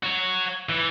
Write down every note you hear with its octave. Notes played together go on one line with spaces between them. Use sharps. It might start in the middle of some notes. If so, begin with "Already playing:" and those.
F#4 C#5
E3